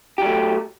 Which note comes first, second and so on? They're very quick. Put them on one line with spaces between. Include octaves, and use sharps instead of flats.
G4 F#3 A3